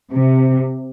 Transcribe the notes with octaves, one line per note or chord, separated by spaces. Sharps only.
C3